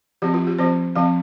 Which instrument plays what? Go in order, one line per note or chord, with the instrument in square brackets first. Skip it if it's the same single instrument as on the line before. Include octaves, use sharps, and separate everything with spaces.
[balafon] F3 C4 G4
F4
G4
F3 C4 C5
F3 C4 F5